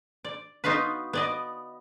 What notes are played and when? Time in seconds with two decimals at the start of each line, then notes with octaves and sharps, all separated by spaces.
0.25 D5
0.64 B3 D#4 F4 F#4 B4
1.13 B3 D5 D#5